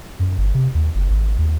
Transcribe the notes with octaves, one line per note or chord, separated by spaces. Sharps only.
F#2
G1
C3
D#2
F#1
G#1
D#2